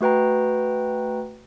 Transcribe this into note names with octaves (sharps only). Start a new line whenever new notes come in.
A3 F#4 B4 G5 A#5